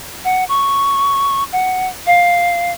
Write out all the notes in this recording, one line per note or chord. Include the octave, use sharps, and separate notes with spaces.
F#5
C#6
F#5
F5